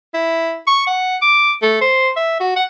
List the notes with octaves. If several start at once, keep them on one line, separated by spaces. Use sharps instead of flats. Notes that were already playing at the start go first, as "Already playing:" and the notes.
E4
C#6
F#5
D6
A3
C5
E5
F#4
F#5